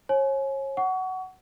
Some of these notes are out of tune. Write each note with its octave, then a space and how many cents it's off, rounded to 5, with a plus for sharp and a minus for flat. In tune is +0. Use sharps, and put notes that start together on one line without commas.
C#5 -35 G#5 +30
F#5 +15 C#6 +30